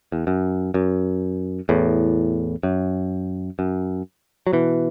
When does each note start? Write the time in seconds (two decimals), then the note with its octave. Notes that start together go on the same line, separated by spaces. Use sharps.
0.12 E2
0.27 F#2
0.74 F#2
1.69 E2 A2
2.63 F#2
3.59 F#2
4.47 F#3
4.53 B2 E3